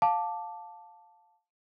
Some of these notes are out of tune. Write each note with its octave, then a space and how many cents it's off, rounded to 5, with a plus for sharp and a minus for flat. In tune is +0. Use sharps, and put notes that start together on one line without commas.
F5 +15 A5 +0 D6 +0